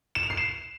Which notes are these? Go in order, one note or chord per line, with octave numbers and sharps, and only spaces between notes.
E7
F7
C7
E7